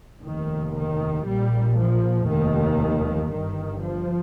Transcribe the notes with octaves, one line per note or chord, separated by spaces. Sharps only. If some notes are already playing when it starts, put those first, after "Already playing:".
F1 D#2 D#3
D#3
A#1 A#2 G3
F3
F1 D#2 D#3
G1 G2 D#3
F3